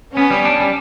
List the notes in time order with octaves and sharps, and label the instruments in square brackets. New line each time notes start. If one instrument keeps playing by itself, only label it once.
[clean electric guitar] B3 [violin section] C#4
[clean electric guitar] G3
D4
G3